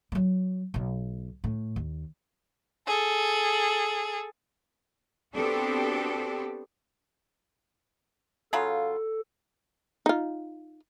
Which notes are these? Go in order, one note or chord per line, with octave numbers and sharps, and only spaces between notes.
F#3 G3
B1 B2
A2
D#2
G#4 A4
B3 C4 D4 F#4 G4 A4
C#3 F#3 F4 A4
D#4 F4